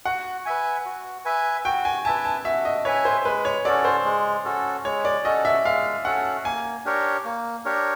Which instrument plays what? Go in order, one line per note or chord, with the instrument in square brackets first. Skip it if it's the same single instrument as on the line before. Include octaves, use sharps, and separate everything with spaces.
[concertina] F#4 [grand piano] F#5
[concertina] B4 E5 G#5
F#4
B4 E5 G#5
[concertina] F#4 [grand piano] G5
[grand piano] G#5
[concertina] B4 E5 G#5 [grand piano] A5
[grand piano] A5
[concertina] F#4 [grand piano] E5
[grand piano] D#5
[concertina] B4 E5 G#5 [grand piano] C#5
[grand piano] C5
[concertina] G#3 [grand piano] B4
[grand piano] C#5
[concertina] C#4 F#4 A4 [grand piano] D5
[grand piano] C5
[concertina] G#3
C#4 F#4 A4
[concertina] G#3 [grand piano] C#5
[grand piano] D5
[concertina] C#4 F#4 A4 [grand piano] D#5
[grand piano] E5
[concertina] G#3 [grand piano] F5
[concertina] C#4 F#4 A4 [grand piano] F#5
[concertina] A#3 [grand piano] G#5
[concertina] D4 G4 A#4 C#5
A#3
D4 G4 A#4 C#5